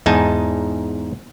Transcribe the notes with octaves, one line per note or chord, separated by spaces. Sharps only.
E2 G#2 D#4 G#5 A5